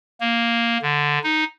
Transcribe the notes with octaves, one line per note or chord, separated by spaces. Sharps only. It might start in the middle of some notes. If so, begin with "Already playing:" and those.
A#3
D3
D#4